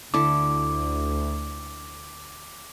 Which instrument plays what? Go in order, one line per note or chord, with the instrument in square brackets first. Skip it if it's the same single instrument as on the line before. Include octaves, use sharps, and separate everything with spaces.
[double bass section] D2 [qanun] D3 E4 A4 [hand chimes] D6